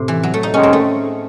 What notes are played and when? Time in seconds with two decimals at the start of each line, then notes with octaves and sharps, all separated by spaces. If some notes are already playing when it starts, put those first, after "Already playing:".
Already playing: A2 C3
0.08 E3
0.23 F#3
0.34 A3
0.43 D#4
0.53 D#2 D#3 G#3 C#4
0.63 C4
0.73 A3